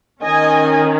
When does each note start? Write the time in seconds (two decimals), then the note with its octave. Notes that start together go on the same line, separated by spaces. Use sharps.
0.22 D#3 C#4 D#5 G#5